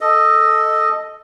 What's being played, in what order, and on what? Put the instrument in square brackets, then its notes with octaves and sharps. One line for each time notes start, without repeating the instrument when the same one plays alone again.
[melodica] A4 D#5